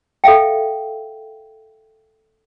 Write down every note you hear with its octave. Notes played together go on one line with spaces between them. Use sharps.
A4 E5 F5 G5